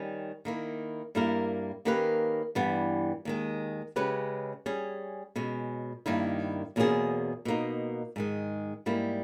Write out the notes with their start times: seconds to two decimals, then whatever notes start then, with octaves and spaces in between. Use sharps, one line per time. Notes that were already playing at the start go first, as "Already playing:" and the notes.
Already playing: D#3 G3 C#4
0.45 D#3 A#3 E4
1.15 G2 G3 A#3 E4 A#4
1.85 D#3 A#3 C#4 G4 B4
2.55 G2 E3 G3 B3
3.25 D#2 D#3 G#3
3.96 C#3 G#3 C#4 G4 B4
4.66 G3 C#4 G#4
5.36 B2 G#3 C#4
6.06 G2 D#3 A#3 E4
6.76 E2 B2 A#3 C#4 G#4
7.45 B2 A#3 D#4
8.16 G#2 D#3 G#3
8.86 G#2 G3 A#3 E4